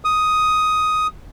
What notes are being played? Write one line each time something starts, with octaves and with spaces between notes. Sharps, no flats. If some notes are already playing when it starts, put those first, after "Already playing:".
D#6